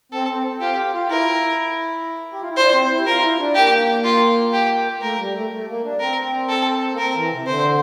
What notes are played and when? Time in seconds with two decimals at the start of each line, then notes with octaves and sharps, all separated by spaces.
0.12 C4 A4
0.28 C4
0.60 F4 G4
0.77 G4
0.93 F4
1.10 E4 A#4
2.33 G4
2.41 F4
2.49 E4
2.57 D4 C5
2.73 C4
2.89 E4
2.99 G4
3.06 F4 A#4
3.22 E4
3.39 D4
3.55 A#3 G4
4.04 F4
4.53 G4
5.02 A3 A#4
5.19 G3
5.35 A3
5.51 A3
5.68 A#3
5.84 D4
6.00 C4 A#4
6.49 A4
6.92 A#3
6.98 C4 A#4
7.15 E3
7.31 C3
7.47 D3 C5